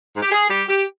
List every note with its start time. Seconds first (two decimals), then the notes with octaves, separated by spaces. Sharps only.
0.14 G#2
0.22 G4
0.32 G#4
0.49 G3 G4
0.67 G4